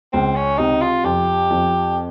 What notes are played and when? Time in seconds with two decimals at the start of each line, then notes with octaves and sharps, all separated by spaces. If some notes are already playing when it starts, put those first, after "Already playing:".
0.13 C#2 C4
0.36 C#4
0.58 C3 D#4
0.82 F4
1.04 F2 G4
1.50 F2